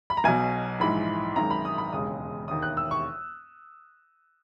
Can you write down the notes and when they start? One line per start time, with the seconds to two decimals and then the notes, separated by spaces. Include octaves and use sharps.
0.10 B5
0.17 A#5
0.24 B1 B2 F#3 G#5
0.80 A#1 G#2 E3 G#3 B5
1.36 G#1 F#2 D#3 G#3 A#5
1.50 B5
1.65 D#6
1.78 B5
1.93 E1 D#2 C#3 G#3 D#6
2.48 E1 D#2 D#3 D#6
2.62 F#6
2.77 E6
2.91 C#6